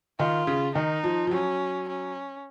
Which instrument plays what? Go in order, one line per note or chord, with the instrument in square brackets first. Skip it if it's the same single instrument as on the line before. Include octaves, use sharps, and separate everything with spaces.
[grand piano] D#3 [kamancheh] F4
[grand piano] C#3
[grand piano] D#3 [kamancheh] D#4
[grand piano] F3
F3
[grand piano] F#3 [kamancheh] C#4
[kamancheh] C#4